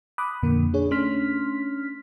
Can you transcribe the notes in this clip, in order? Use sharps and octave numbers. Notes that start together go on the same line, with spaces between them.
B5 D6 D#6 F#6
F2 A#2 D3 A#3
D4 G#4 C#5
A3 C#4 D4 C6 F6 B6